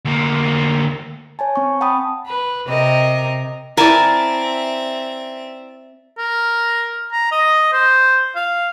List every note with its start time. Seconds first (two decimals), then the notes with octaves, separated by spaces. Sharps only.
0.05 D2 A#3
1.39 C#5 G#5 A5
1.56 C4 C#6
1.81 F#5 G5 A5 B5 D#6
2.26 B4
2.68 C3 A#4 D#5
3.77 C4 E4 A#4 D5 E5 G#5 A5
6.18 A#4
7.12 A#5
7.32 D#5
7.73 C5
8.36 F5